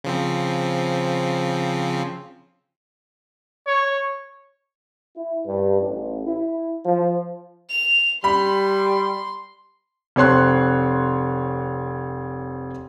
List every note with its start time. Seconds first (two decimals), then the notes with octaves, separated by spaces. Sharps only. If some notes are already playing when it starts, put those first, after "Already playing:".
0.04 C#3 F3 C4
3.66 C#5
5.16 E4
5.45 G2
5.80 A1
6.26 E4
6.86 F3
7.70 F7
8.24 G3 B5 C6
10.16 F1 C4 C#5 C6 F#6